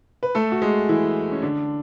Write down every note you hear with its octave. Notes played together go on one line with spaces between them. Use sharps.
B4
A3 A4
F#4
G#3 G#4
E3 E4
C#4
D3 D4